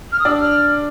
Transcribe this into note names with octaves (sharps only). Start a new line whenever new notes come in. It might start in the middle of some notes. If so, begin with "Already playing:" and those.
F6
D#6
D4 D5 E6
F6